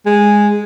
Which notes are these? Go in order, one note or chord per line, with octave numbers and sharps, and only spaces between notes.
G#3